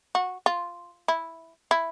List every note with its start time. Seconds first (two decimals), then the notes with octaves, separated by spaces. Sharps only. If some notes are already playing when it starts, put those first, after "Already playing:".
0.15 F#4
0.46 F4
1.08 E4
1.71 E4